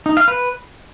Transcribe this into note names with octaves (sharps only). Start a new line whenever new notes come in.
D#4
F5
B4